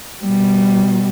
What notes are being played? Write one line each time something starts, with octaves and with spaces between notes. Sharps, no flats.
B2 G3